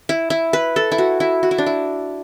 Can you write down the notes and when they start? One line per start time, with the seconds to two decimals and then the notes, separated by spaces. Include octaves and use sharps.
0.09 E4
0.30 E4
0.53 B4
0.76 A4
0.92 E4
0.98 F#4
1.20 E4
1.43 F#4
1.51 E4
1.58 D4
1.66 E4